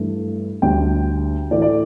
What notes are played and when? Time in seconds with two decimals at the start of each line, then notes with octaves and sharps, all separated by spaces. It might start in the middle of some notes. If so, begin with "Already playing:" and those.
Already playing: G2 E3 A3
0.62 D2 D3 G3 G5
1.51 A2 E3 A3 D5
1.62 D5